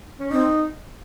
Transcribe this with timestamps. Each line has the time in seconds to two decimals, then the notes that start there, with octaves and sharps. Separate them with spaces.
0.19 C#4
0.31 C4 D#4